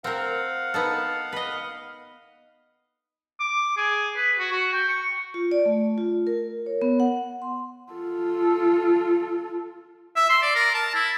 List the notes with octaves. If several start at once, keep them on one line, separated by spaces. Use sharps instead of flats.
C4 A#4 F5 F#5
B3 D#4 A4
B4 D#5
D6
G#4
B4
F#4
F#4
G5
C#6
F4
D5
A3
F4
A#4
C#5
B3
F#5
C6
F4 A4
E5
C6
D5
A#4
A5
E4